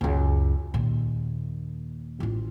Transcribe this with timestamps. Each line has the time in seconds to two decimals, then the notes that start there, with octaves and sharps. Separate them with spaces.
0.01 C#2 F#2
0.74 D#2 A#2
2.20 A1 F4